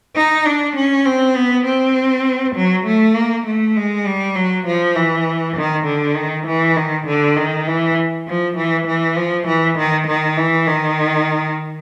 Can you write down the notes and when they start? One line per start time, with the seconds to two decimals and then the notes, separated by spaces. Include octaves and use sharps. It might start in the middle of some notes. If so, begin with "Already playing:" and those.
0.16 D#4
0.46 D4
0.75 C#4
1.06 C4
1.36 B3
1.65 C4
2.55 F#3
2.86 A3
3.15 A#3
3.46 A3
3.76 G#3
4.06 G3
4.35 F#3
4.66 F3
4.96 E3
5.56 D#3
5.86 D3
6.16 D#3
6.46 E3
6.76 D#3
7.07 D3
7.37 D#3
7.67 E3
8.27 F3
8.56 E3
8.87 E3
9.16 F3
9.47 E3
9.78 D#3
10.07 D#3
10.37 E3
10.67 D#3